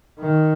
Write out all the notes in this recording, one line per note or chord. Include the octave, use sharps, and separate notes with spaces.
D#3